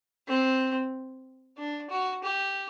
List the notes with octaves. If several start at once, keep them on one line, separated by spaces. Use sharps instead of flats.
C4
D4
F#4
G4